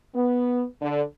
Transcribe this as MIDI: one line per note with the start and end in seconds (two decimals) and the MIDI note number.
0.15 0.64 59
0.81 1.02 50